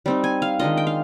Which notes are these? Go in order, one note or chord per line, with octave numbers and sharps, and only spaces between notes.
G3 C4 D#4
G#5
F5
D#3 G#3 D4 F4 D#5
G5
F5